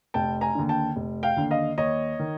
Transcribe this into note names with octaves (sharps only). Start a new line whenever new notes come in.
F1 G5 A5
G#5 A#5
D#2 D3
G5 A5
F1
F5 G5
D#2 D3
D#5 F5
D#2 C#5 D#5
D#3